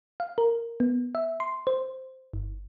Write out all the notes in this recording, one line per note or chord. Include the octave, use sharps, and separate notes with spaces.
F5
A#4
B3
E5
C6
C5
G1